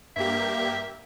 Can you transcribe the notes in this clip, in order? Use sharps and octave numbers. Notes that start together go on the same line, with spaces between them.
G2 A#3 G4 E5